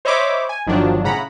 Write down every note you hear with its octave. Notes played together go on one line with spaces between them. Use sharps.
C5 C#5 D#5 E5 B5 D6
G#5
G1 D#3 F3 F#3 D4
A2 C#3 F#5 A#5 B5